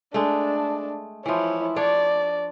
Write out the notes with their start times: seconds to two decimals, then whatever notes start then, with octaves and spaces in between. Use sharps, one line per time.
0.14 G#3 A3 D4
1.26 E3 F3 E4 C#5
1.76 D4 C#5 D5